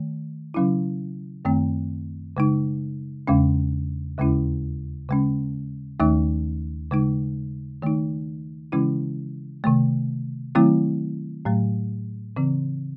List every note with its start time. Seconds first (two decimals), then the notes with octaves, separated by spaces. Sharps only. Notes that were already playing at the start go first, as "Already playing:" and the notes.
Already playing: D#3 A3
0.54 C#3 F#3 C#4 E4
1.45 F#2 D#3 A3 C4
2.37 C#3 G#3 D#4
3.27 E2 C#3 G#3 C#4
4.18 D#2 C#3 G#3 C#4 E4
5.09 C#3 G#3 C#4
6.00 D#2 D#3 A3 D#4
6.91 C#3 G#3 D#4
7.82 D#3 A3 D#4
8.72 C#3 E3 G#3 C#4 E4
9.64 C3 D#3 A3
10.55 D#3 F#3 A3 C4 E4
11.45 A2 F#3 A3
12.36 C#3 E3 C4